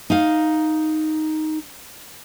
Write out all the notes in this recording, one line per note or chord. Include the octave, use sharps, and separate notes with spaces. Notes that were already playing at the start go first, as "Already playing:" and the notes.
D#4 F5